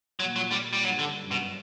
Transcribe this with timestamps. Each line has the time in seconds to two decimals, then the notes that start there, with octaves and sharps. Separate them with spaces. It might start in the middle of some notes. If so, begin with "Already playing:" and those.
0.20 A#2 F#3
0.36 F#3
0.51 G3
0.73 G3
0.84 G2 F#3
0.99 D3
1.16 F#2
1.31 B2